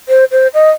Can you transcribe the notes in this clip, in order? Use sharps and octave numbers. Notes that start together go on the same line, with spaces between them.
C5
C5
D#5